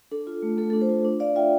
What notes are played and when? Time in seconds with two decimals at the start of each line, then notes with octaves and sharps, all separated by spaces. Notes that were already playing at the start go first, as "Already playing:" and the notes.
0.11 D4 A4
0.27 F4
0.42 A3
0.58 A3 A4
0.70 A4
0.73 D4
0.81 A4 C5
0.89 F4
1.05 D4
1.20 D4 D5 F5
1.36 F4 E5 G5